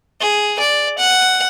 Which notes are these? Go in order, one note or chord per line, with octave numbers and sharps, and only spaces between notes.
G#4
D5
F#5